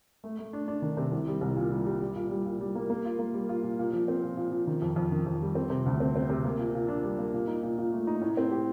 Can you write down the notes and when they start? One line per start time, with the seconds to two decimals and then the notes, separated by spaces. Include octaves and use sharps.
0.24 A3
0.39 A3
0.53 D4
0.68 D4
0.82 D#3
0.97 C3
1.12 C2
1.27 G3
1.41 C2
1.56 A#2
1.72 G3
1.86 G3
2.01 G3
2.16 A#2
2.31 G3
2.45 A#2
2.61 G3
2.75 A#3
2.90 A#3
3.05 F4
3.19 A#3
3.34 G3
3.49 F4
3.63 A#2
3.79 A#2
3.93 F3
4.08 C4
4.23 A#2
4.37 A#2
4.52 F3
4.67 D#3
4.82 F2
4.96 F2
5.12 D#3
5.26 F2
5.42 G3
5.55 C4
5.70 C3
5.86 D2
6.00 C4
6.16 C4
6.30 C3
6.45 A#3
6.59 A#2
6.75 A#2
6.88 D4
7.03 G3
7.19 A#3
7.34 A#2
7.48 D#4
7.63 A#2
7.78 A#2
7.93 A3
8.07 D#4
8.22 A2
8.37 C4
8.51 G4